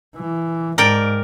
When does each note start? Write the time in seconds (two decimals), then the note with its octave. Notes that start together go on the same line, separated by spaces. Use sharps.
0.16 E3
0.78 G#2 A#4 D5 G5